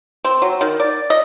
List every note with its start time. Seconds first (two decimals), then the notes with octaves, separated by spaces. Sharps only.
0.25 C4
0.42 F#3
0.61 D#3
0.80 D5
1.10 D#5